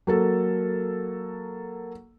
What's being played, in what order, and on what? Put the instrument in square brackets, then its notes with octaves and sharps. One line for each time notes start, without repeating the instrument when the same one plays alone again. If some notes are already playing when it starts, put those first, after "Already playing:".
[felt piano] F#3 A#3 A4